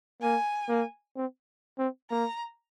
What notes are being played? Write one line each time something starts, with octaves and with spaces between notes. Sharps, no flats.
A#3 G#5
A#3
C4
C4
A#3 A#5